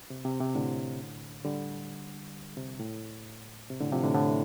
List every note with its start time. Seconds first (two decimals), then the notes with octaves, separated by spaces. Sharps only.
0.10 C3
0.25 C3
0.40 C3
0.55 A2 D3
1.45 D3 G3
2.57 C3
2.80 A2
3.70 C3
3.81 A2 D3
3.92 C3 F3
4.03 A2 D3
4.14 A2 D3